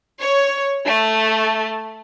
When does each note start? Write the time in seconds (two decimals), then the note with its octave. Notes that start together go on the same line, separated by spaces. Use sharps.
0.20 C#5
0.86 A3